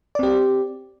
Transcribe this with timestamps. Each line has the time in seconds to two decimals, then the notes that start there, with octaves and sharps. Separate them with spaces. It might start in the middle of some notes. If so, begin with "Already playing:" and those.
0.15 D5
0.19 C4
0.23 G4